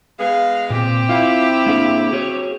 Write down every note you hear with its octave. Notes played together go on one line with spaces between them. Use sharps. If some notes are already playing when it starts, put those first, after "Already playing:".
G#3 B3 G#4 F5
A#2 C4 G4
E4 F4 F5
A#3 D4 G#4
F#4 G#4 C#5